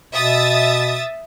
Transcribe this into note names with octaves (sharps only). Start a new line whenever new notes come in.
B2 E5 D#6 A6